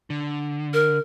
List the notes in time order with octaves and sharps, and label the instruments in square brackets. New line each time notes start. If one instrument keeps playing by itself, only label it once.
[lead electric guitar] D3
[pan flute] A#4